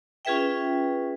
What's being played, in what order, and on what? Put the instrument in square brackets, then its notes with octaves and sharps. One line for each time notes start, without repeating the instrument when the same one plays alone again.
[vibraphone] C#4 F4 G#4 B4 E5 G5